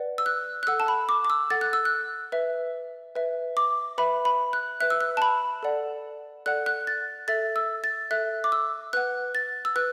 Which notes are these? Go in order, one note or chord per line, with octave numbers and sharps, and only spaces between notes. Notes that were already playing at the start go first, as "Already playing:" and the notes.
Already playing: B4 D5 F#5
E6
F#6
F#6
A4 F#5 E6
A5
B5
D6
D6
E6
A4 F#5 A6
F#6
E6
F#6
B4 E5
B4 E5
D6
B4 E5 B5
B5
F#6
B4 E5 F#6
E6
F#6
A5
B5
A4 D5 F#5
A4 D5 F#5 F#6
F#6
A6
A4 E5 A6
E6
A6
A4 E5 F#6
D6
E6
B4 F#5 F#6
A6
E6
B4 F#6